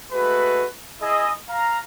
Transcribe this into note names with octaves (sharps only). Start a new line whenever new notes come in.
G#3 A3 F#4 B4
E4 G#4 D#5
F5 A#5